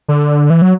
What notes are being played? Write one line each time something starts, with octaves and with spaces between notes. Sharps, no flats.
D3
E3
F#3